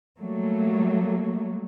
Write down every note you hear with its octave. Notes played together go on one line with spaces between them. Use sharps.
F#3 G3 A3 A#3